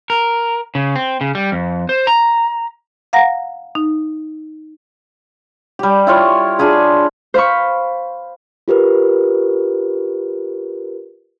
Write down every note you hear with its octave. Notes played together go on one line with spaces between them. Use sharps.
A#4
C#3
C4
C#3
G3
F2
C5
A#5
F5 F#5 A#5 A#6
D#4
G3 G4
E4 F4 C#5
D4 F4 G#4 B5
C5 F5 B5 C#6
F4 G4 A#4 B4